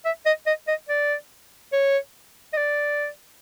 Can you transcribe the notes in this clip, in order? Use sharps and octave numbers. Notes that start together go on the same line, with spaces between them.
E5
D#5
D#5
D#5
D5
C#5
D#5
D5